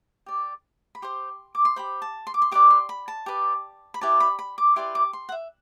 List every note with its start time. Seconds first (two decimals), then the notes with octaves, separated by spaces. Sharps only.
0.26 G4 D5
0.95 B5
1.02 G4 C5 C6
1.55 D6
1.65 C6
1.76 G4 C5 B5
2.02 A5
2.27 C6
2.34 D6
2.42 C6
2.51 G4 B4 D5 D6
2.70 C6
2.89 B5
3.08 A5
3.26 G4 B4 D5
3.94 B5
4.01 E4 G4 B4 D5 A5
4.20 B5
4.39 B5
4.58 D6
4.76 E4 G4 B4 D5 C6
4.95 D6
5.13 C6
5.29 F#5
5.32 E5